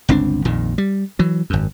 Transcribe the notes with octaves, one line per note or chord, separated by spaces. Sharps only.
G1 C#2 C4 D4
A#1 F2 A#2 D#3
G3
E3 F#3
G#1 F#2